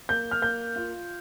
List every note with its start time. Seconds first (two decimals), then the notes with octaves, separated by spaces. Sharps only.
0.09 A#3 G6
0.31 F6
0.42 A#3 G6
0.76 F4